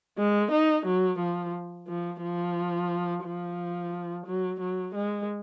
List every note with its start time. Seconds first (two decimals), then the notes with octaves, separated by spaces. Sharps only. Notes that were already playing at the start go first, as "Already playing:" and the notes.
0.18 G#3
0.51 D#4
0.86 F#3
1.19 F3
1.88 F3
2.22 F3
3.24 F3
4.27 F#3
4.60 F#3
4.95 G#3